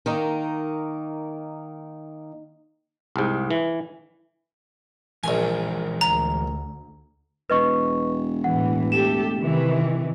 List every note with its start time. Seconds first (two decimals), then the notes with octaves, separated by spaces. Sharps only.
0.06 D#3 A#3 D#4
3.16 C2 G#2
3.51 E3
5.24 A#1 E3 G#3 A#4 G#5
6.01 D2 A#5
7.50 E1 B4 D#5 C#6
8.44 A2 E3 F#5
8.92 A3 G4 A4 E7
9.39 C3 D#3 E3